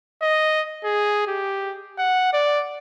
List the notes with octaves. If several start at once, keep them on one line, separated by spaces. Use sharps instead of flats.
D#5
G#4
G4
F#5
D5